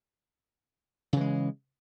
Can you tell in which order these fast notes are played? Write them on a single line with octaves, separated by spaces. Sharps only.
C#3 E3 G#3